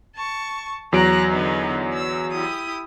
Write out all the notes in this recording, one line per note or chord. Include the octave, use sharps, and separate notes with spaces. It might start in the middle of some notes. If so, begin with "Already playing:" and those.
A5 C#6
E2 F#3 A#5 F#6 A#6 D7
D3 B3 D#4
E6
E4 G4 D#6